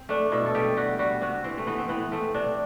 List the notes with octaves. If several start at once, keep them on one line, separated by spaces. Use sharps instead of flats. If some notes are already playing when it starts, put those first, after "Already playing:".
Already playing: C4
A3 D4
B2 E4
A4
A3 G4
G3 F#4
G3 F#4
C3 F#4
E3 C4
A3
E3 B3
C4
E3 B3
A3 C4
C3 D4